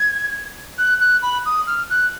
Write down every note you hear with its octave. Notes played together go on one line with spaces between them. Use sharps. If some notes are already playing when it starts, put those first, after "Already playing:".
Already playing: G#6
F#6
F#6
B5
D#6
F6
F#6